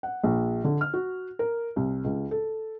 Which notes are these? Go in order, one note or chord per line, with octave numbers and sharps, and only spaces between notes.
F#5
A#1
D3
F6
F#4
A#4
C2
C#2
A4